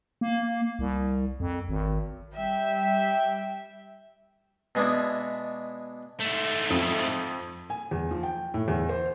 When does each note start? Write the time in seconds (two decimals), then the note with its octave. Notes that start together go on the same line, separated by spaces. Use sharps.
0.21 A#3
0.79 C2
1.40 F2
1.69 G#1
2.35 G3 E5 G5
4.75 B2 G#3 B3 D4 E4
6.20 G#2 A3
6.70 F2
7.70 G#5
7.91 E2
8.11 F3
8.23 G5
8.54 A2
8.68 E2
8.89 C5